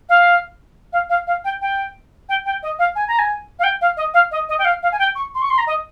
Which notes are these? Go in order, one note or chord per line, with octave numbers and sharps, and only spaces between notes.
F5
F5
F5
F5
G5
G5
G5
G5
D#5
F5
G#5
A#5
G#5
F5
G5
F5
D#5
F5
D#5
D#5
G5
F5
F5
G#5
G5
C#6
C6
C#6
C6
A#5
D#5